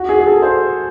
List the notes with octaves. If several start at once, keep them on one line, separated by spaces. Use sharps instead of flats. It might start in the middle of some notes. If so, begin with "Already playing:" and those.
Already playing: F#4
G#4
G#4
A4
C5